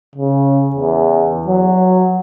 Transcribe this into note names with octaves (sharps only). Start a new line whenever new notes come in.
C#3
E2
F#3